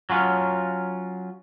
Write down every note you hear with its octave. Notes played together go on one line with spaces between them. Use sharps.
F#3 C#4 F4